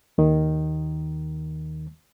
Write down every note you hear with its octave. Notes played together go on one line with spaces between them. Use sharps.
D#2 D#3